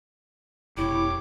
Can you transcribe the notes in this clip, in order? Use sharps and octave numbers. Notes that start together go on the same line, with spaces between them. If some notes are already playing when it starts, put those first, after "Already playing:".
F1 B2 E4 G4 C#5 D6